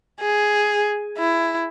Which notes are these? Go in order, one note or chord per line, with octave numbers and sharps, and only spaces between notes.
G#4
E4